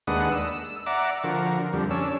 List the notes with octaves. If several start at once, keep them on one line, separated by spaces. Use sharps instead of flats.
D#2 G#3 D4 B4 F#5 D#6
E6
D5 E5 F#5 A#5 D6
D3 F3 F#4 A#4
F2 D3 G3
C#4 D4 E6